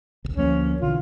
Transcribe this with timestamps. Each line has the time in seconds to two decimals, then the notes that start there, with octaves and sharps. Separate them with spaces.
0.25 D1 B1
0.37 D2 F3 A#3 C#4
0.82 B1 D3 E3 F4